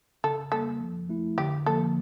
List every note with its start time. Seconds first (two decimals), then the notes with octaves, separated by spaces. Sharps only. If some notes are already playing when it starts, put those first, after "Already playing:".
0.24 C#3 A4
0.52 G3 A#3 A4
0.81 F3
1.09 A3 E4
1.38 D3 G4
1.66 F3 A#3 A4